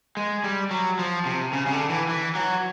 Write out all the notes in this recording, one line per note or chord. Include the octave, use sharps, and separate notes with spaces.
G#3
G3
F#3
F3
C3
C#3
C#3
D3
E3
E3
F#3